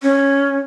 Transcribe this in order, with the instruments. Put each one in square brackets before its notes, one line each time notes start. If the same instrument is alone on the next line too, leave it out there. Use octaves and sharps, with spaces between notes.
[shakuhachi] C#4